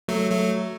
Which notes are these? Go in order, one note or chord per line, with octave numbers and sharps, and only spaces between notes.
F#3 A3
F#3 A3